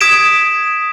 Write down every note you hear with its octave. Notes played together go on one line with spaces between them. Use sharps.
D#6 G#6 B6 D7 E7